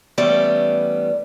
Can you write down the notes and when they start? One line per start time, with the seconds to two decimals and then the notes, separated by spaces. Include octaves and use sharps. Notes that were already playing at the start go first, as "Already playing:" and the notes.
0.18 E3 G3 A3 B3 C#4 D5